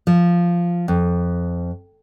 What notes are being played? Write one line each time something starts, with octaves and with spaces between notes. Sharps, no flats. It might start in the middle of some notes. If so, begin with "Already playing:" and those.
F3
F2